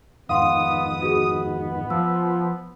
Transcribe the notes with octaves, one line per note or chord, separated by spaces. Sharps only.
F2 G#2 D#3 B3 F5 F#5 C6 D#6
B3 F#4 G#4
F3 E6